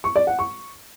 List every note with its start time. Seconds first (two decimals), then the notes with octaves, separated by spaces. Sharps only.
0.04 C#6
0.16 D5
0.27 F#5
0.39 C#6